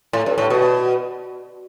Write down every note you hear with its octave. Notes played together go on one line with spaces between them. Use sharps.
A2
G2
A2
B2